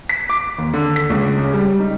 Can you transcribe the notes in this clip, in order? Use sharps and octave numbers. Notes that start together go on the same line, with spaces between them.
B6
D6
D#2
D3
B6
C#2
C#3
G3
D#4